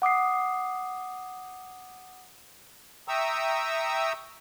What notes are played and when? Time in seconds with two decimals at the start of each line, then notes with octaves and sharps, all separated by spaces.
0.02 F#5 D6 D#6 C7
3.08 E5 G5 A#5 C#6 D#6 E6